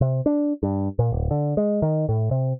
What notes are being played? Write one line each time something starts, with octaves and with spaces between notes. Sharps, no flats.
C3
D4
G2
A#2
D1
D3
G#3
D#3
A2
C3